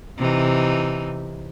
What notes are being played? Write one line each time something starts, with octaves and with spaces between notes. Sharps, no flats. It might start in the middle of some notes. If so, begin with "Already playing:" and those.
C3 E3 D#4